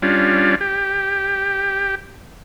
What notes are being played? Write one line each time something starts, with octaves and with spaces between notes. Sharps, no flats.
G3 C#4 D4 F4
G4